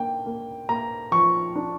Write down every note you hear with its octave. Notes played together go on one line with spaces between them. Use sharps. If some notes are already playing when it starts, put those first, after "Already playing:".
Already playing: A#3 D4 G5
A#3
A#3 A#5
F3 C#6
D4